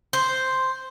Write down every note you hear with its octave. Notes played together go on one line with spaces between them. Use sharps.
C5